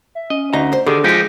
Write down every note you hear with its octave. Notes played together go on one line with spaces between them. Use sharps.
E5
C#4 D#5
D2 D#4 A#5
C5
D3 D#3 G4 G#4
F3 G#3 D#4 F4 G4